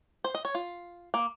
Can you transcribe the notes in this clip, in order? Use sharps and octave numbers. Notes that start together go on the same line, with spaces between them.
C5
D#5
C#5
F4
A#3